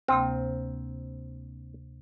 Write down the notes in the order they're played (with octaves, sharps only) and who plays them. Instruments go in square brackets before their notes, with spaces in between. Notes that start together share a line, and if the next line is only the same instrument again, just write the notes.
[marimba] D2 C3 A#3 [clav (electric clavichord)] C4